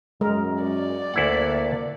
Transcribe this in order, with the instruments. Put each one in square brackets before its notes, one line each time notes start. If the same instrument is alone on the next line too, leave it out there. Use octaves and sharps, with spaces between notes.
[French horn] F#2 [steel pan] G#3 A#4
[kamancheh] D5
[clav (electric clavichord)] D2 E4 F#5 [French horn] A#3